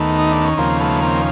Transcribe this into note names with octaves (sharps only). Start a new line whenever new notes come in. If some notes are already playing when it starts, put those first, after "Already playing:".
Already playing: D#2 D#3 A3 B3
D#4
D4
C#4
D#2 C#3 F3 A#3 C4
A3 B3
A#3 C4